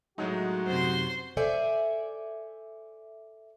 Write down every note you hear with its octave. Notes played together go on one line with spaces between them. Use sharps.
A2 F#3 G#3 D#4 F#4
F#2 C3 C5 C6
A4 C5 D5 E5 G#5